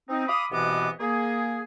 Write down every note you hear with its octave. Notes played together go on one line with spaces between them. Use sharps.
C4 D#4
F5 B5 D6 D#6
C2 B2 E3 B3 D#5 D6
A#3 G#4